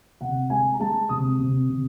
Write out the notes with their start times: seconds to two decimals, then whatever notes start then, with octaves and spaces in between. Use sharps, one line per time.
0.21 C3 F#5
0.50 G#3 G#5
0.74 A#5
0.80 G#3 A5
1.09 C3 D#6
1.39 C3
1.69 C3